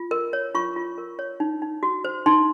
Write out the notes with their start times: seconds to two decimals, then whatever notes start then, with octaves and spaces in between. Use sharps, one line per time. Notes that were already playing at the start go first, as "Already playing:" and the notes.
Already playing: F4
0.11 A#4
0.33 C#5
0.54 F4 C#6
0.76 F4
0.98 A#4
1.19 C#5
1.40 D#4
1.62 D#4
1.83 F#4
2.04 C5
2.26 D#4 C6